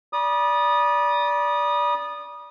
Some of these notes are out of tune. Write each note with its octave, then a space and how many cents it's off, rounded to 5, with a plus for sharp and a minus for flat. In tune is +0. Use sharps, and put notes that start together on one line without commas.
D5 -15 B5 -40 D#6 -20